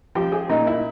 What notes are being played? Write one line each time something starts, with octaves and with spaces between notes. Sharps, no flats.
F3 G4
G#4
A#2 D#4
E4